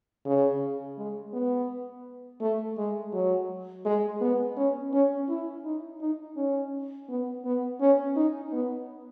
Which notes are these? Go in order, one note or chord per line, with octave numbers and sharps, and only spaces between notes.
C#3
G#3
B3
A3
G#3
F#3
G#3
B3
C#4
C#4
E4
D#4
D#4
C#4
B3
B3
C#4
D#4
B3